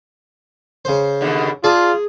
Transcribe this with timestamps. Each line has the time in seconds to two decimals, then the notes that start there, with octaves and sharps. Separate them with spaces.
0.85 C#3 C5
1.21 D#2 B2 D3
1.64 F4 G#4 D5 A5